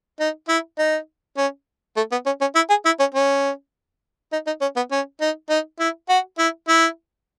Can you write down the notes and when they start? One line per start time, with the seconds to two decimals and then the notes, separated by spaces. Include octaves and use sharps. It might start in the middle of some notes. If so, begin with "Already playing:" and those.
0.20 D#4
0.49 E4
0.79 D#4
1.37 C#4
1.96 A3
2.11 B3
2.26 C#4
2.41 C#4
2.55 E4
2.70 G#4
2.85 E4
2.99 C#4
3.14 C#4
4.32 D#4
4.47 D#4
4.61 C#4
4.76 B3
4.91 C#4
5.21 D#4
5.50 D#4
5.79 E4
6.09 F#4
6.39 E4
6.68 E4